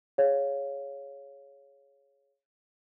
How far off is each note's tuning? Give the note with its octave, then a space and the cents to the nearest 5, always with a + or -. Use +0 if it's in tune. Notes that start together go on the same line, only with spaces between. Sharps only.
G#4 +0 C#5 +0 F5 +0